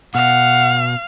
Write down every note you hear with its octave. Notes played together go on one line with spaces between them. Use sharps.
B2 F5 F#5